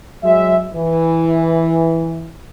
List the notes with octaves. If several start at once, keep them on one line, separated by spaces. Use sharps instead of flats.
F#3 G#3 E5
E3